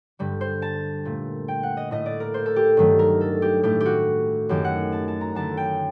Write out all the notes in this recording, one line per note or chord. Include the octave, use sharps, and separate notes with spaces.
G2 D3 G3
C5
A5
A#2 A3
G5
F#5
D#5
A2 A3 D#5
D5
A#4
C5
A4
G4
G2 D#3 F#3 A3
A#4
A4
G4
A2 A3 G4
G4
F#4
F#2 D#3 A3 G4
F#5
A5
A5
A#5
F#2 D3 A3 A5
G5